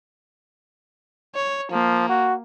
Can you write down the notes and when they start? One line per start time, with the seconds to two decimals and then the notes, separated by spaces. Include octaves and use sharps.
1.35 C#5
1.72 F3 A#3
2.09 F#4